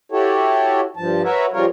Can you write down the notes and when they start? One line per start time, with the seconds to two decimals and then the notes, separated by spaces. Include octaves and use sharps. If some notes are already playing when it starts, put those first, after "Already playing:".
0.12 E4 F#4 G4 A4 C#5
0.97 G2 F3 A5
1.24 F#4 A#4 B4 C#5 E5
1.53 C#3 F3 G3 F4 A#4 C#5